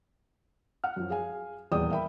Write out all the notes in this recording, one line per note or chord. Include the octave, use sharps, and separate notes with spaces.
F#5 F6
F#2 F3
G#4 F5 G#5
D#1 E2 G#4 D5 G5 D#6
A#4 E5 G5 B5